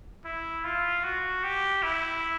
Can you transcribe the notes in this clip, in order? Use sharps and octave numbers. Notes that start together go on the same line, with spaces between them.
E4
F4
F#4
G4
E4